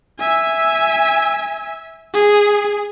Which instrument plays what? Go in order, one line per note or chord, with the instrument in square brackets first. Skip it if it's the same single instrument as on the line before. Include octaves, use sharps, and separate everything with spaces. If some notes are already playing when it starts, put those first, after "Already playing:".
[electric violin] E5 G#5
G#4